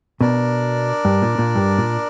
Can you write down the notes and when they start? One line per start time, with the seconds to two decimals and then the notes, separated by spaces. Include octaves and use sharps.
0.21 B2 D4 A#4 D5
1.05 G2
1.22 A#2
1.38 A#2
1.55 G2
1.78 A#2